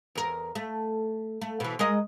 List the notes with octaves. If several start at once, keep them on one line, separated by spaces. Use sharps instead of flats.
E2 A#4
A3
A3
B2 E3
G#3 A#4 D#5